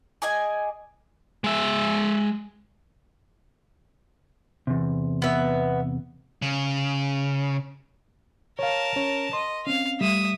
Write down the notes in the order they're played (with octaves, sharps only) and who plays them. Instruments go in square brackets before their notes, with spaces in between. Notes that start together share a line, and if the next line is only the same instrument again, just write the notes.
[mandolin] G#4 D5 D#5 G#5
[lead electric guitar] G#3 E5
[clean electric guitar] E2 C3
[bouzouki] B3 E5
[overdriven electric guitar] C#3
[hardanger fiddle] A#4 A5 [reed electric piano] C#5 F5
[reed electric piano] C#4 C#5
[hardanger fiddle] D#5 [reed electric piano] C6
[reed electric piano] C4 C#4 [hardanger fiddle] F5
[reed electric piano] G3 A3 [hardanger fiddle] E5 D#6